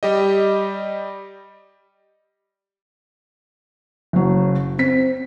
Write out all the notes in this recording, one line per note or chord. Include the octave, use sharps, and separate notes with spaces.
G3 G4 D#5
F#1 F#3
C4 B6